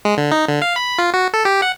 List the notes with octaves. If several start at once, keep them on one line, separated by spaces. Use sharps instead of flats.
G#3
D3
D#4
D3
F5
B5
F4
F#4
A4
G4
F#5